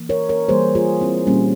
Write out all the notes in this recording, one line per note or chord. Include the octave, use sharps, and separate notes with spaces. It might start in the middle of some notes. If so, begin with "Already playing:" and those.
Already playing: E3 A#3
A#4 C#5
A#4 C#5
E3 G3 A#3 G#4 C5
F4 G#4
C4 E4
A#2 G3 A#3 C#4